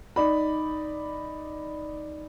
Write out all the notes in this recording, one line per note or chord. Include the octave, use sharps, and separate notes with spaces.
D#4 D5 B5